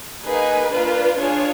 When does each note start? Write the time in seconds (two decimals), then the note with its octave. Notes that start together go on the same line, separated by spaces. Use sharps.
0.24 A#3 D#4 G#4 B4
0.71 A#3 D4 F4
1.19 D4 F4 G#4 C#5